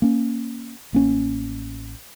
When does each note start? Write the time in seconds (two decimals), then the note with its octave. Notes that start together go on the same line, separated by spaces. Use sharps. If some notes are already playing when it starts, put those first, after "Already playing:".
0.02 A#3 C#4
0.93 A1 A#3 C#4